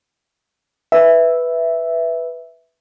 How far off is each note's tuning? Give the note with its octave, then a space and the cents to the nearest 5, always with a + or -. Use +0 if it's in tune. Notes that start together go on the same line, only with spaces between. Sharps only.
B4 +0 E5 +0